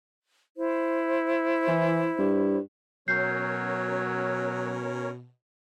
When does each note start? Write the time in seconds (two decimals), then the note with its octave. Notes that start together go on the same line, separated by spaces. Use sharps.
0.57 E4 C5
1.68 E3
2.18 G2
3.08 B2 F#3 C#4 A#4 C#5 G6 C7